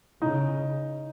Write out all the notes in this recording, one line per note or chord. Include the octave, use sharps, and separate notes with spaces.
C#3 D#4